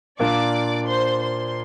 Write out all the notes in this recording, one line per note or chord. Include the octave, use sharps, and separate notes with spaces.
A#2 A#3 D4 F4 D5 D6
C5 C6
C5 C6